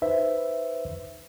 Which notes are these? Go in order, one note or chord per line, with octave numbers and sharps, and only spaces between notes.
D#4 B4 C5 E5